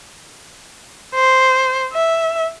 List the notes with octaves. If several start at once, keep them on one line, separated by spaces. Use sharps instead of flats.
C5
E5